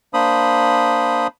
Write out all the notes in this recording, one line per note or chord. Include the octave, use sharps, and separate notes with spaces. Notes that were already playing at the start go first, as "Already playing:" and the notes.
A#3 D4 C5 B5 D#6